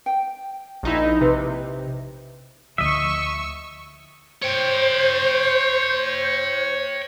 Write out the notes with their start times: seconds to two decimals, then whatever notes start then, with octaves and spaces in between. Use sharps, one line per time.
0.06 G5
0.83 A#1 D#4 E4
1.21 C3 B4
2.78 D2 F3 D#5 E5 C#6 E6
4.42 C5 C#5 G5